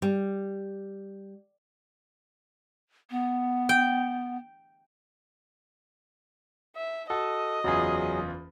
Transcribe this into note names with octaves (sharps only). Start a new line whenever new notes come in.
G3
B3
G5
E5
F#4 A4 D#5
F#1 E2 F#3 F4 G#4